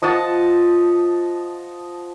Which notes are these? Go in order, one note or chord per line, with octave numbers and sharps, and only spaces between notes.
F3 D#5 F#5 A5